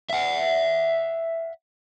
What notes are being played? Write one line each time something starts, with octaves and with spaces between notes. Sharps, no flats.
E5 F#5